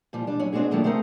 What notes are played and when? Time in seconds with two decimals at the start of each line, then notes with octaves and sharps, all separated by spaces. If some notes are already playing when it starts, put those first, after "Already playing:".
0.13 A#2 F3 G3
0.27 G3 D4
0.40 F#3 C#4
0.53 G#3 B3 C4 D4 F#4 G#4
0.71 D#3 F3 F#3 A3 A#3 D4
0.84 A3 C4 G#4 A#4 F#5